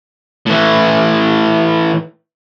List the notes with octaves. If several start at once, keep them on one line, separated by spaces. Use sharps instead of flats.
A2 E3